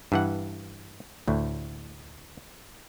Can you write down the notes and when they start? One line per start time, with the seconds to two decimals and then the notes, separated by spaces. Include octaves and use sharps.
0.12 G2 E3 F#5
1.28 D2 A2